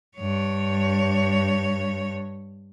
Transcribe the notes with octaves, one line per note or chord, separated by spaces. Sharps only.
G2 C#5